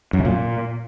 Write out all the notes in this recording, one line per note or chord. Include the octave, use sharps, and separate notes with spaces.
F#2
C#3
A#2